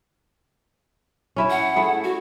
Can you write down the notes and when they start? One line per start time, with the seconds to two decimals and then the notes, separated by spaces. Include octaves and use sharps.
1.36 C#4 E4 E5
1.50 F#5
1.76 A3 E4 G#4
2.04 F#4